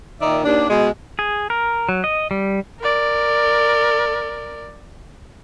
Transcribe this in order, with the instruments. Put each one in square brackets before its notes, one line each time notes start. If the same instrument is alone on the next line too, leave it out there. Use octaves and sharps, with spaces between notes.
[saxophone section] A#2 D#3 D#4 D5 E5
D#2 D4
B2 G#3
[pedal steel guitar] G#4
A#4
F#3
D#5
G3
[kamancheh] A#4 D5